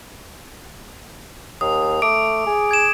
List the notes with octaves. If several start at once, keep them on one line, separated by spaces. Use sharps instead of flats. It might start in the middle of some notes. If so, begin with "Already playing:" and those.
D#2 D#6
A3 D6 D7
G#4
G#6 E7